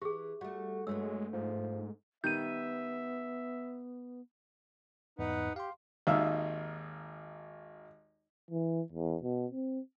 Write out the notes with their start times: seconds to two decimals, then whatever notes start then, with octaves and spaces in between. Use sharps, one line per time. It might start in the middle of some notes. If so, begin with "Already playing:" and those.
0.02 E3 G4 G#4
0.41 G3 A3 F#4
0.87 G2 F#3 G#3 A3 B3 E6
1.33 G#2 F3
2.24 D#3 G3 B3 E5 G6 D#7
5.19 E2 G#2 D#4 B4 F#5
5.56 G4 F5 C6
6.07 G#1 D#2 D#4 E5 F5
8.51 E3
8.92 E2
9.23 B2
9.51 C4